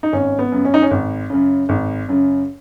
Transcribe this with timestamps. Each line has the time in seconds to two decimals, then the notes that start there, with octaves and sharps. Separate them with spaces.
0.03 D#4
0.13 G#1 C#4
0.39 B3
0.52 F#2 C#3
0.65 C#4
0.74 D#4
0.82 C#4
0.91 G#1
1.30 F#2 C#3
1.69 G#1
2.09 F#2 C#3